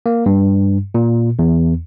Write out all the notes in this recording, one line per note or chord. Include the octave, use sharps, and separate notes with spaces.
A#3
G2
A#2
E2